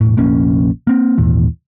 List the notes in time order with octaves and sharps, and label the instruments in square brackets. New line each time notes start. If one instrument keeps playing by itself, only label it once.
[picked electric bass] E1 A2
F1 A#1 A#3 C#4
A#3 C4
G#1 D#2 A#2 E3